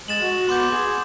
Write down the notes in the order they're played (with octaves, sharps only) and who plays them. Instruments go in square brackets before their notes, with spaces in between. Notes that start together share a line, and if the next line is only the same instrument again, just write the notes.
[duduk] G#3 [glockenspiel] A6 E7 F#7
[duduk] F#4
[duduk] B3 [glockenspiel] C6 D6 G6
[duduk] G#4